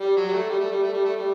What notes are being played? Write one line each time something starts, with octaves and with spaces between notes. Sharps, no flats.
G3
F#3
G3
A3
G3
A3
G3
A3
G3
A3
G3